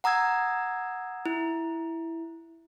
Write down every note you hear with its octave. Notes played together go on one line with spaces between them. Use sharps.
F#5 A#5 D#6 E6 G#6
E4